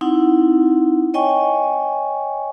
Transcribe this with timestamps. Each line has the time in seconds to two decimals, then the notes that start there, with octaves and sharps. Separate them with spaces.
0.01 C4 D#4 E4 F#5
1.14 C#5 D#5 G5 G#5 C#6